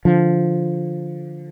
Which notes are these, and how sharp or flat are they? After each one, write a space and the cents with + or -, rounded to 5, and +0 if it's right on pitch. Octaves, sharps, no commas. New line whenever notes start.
D3 +0 F3 +0